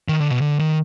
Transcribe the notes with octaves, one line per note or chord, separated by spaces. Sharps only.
D#3
D3
B2
D3
D#3